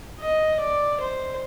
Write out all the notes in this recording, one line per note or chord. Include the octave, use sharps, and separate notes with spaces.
D#5
D5
C5